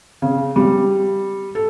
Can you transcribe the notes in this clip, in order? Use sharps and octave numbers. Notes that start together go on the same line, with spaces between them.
C#3
G3
A4